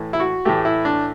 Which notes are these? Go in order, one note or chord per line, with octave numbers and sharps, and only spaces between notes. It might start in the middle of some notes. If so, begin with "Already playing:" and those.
Already playing: A2 E3 A3
E4
F#4
A2 E3 A3 G4
E4
D4